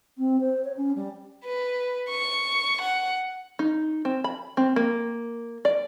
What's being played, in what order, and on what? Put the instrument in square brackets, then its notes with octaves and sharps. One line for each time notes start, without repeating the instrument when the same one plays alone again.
[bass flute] C4
C5
C#5
C#4
G3
[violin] B4
C#6
F#5
[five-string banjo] D#4
C4
B5
C4
A#3
D5